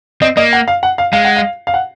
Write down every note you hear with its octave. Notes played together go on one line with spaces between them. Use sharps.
C4 D#5
A#3 D#5
F#5
F5
F#5
F5
G#3 F5
F#5
F5
F5
F#5